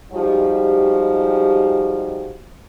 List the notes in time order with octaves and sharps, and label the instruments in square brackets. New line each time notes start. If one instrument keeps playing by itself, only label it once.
[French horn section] F3 G3 G#3 D#4 F#4 G4